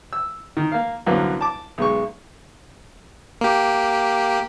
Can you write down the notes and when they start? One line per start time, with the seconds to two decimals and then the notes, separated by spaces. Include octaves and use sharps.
0.13 E6
0.57 D#3
0.72 A#3 F5
1.06 C2 F#2 D3 F#3 A#3 B3
1.41 A5 D6
1.78 B1 G#3 C#6
3.41 A#3 G4